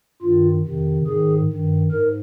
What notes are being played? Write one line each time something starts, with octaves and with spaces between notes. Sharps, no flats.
G2 D#3 F4
F2 C3 D#3
G#2 D#3 G#4
G2 D#3
G#2 A#4